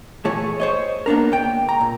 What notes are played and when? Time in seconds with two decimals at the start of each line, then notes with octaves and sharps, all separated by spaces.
0.25 A#2 E3 A3 G#4 C#5
0.60 C5 C#5 D#5
1.06 A#3 B3 D4 A#4
1.32 C#2 G5
1.69 A#5
1.81 A#2